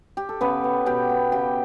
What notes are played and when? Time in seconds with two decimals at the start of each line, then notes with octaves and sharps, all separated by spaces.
0.17 G4
0.29 A4
0.41 C#3 B3 B4
0.64 B3
0.86 B2 G4 G5
1.09 B3
1.32 C#3 G4 G5